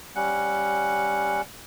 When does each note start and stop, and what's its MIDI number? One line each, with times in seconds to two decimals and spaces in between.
0.16 1.41 55
0.16 1.41 61
0.16 1.41 78